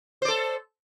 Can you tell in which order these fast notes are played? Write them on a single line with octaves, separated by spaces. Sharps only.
C5 D5 A4